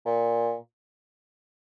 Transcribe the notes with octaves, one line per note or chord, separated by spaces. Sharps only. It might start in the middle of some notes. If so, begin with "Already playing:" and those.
A#2